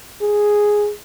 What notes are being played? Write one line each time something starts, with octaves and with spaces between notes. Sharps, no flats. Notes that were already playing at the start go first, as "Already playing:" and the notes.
G#4